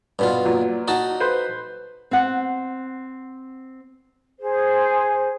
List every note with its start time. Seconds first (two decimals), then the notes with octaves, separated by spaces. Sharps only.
0.19 G2 B2 F4
0.45 A#2 F#3
0.88 D#4 F#4 A5
1.20 B4 C5
2.11 C4 F#5
4.39 G#4 C5